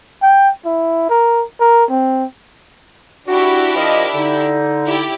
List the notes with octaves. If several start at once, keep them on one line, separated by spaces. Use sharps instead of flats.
G5
E4
A#4
A#4
C4
D4 E4 F#4 G4
F3 A#4 D#5
D3 D#4
E4 G4 D5